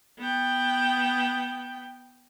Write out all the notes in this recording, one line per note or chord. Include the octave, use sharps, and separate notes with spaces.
B3 G5